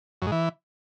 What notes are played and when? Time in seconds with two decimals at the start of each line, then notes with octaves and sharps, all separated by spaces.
0.22 F#2
0.27 G#2
0.32 E3